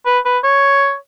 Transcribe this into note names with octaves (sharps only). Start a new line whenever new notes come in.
B4
B4
C#5